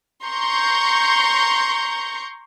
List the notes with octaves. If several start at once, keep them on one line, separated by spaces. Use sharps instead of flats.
A#5 C6 C#6 G6